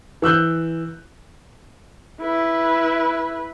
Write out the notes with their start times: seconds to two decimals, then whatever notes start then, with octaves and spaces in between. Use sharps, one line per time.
0.22 E3 E6 F#6 G6
2.21 E4 B4